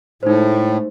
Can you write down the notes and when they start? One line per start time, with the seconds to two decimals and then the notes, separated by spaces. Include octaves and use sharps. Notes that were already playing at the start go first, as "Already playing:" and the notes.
0.23 A2 G#3 A3 D#4 C5